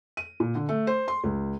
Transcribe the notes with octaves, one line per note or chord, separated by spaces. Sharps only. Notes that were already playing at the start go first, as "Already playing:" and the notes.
D#7
A#2
D3
A3
C5
C6
C#2